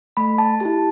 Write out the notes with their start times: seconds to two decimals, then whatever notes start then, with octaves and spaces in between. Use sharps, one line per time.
0.17 A3 B5
0.38 A5
0.60 E4 G4 A5